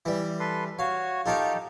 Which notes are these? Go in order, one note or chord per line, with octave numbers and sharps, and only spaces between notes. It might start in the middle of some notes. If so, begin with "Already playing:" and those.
E3 G3
A4 B4 C6
F#4 C#5 F5
D#4 F4 G4 A4 A#4 C#5